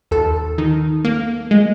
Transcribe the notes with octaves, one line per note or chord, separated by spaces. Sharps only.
D#2 A4
D#3
A#3
G#3